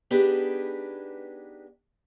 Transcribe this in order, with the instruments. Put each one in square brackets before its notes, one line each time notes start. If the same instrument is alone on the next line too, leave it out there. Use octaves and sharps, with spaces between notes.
[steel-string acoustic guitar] B3 D4 D#4 G4 G#4 B4